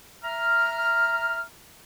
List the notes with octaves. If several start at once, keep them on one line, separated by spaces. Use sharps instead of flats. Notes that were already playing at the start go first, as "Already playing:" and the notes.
E5 A#5 F6